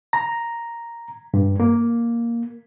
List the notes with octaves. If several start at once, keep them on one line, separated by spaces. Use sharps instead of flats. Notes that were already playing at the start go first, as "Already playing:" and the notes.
A#5
G2
A#3